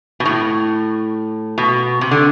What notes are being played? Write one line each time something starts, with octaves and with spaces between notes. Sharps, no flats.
B2
A2
B2
C3
D3